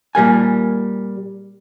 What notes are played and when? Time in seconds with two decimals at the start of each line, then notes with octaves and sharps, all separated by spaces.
0.15 A#2 G3 A#4 G#5